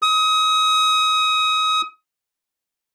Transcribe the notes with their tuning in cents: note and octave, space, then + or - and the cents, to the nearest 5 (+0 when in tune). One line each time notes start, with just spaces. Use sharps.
D#6 +30